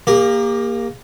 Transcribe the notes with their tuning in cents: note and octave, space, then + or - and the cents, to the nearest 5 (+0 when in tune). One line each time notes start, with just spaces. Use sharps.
A#3 +0 G4 +40